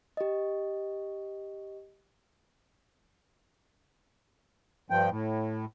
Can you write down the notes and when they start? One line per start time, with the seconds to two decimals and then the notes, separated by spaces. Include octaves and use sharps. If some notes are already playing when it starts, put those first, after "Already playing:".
0.17 G4 D#5
4.90 G2 F3 G5
5.10 A2